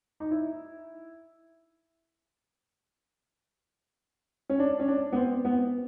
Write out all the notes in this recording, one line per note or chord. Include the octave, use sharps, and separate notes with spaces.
D#4
E4
C#4
D4
C#4
D4
B3
C4
B3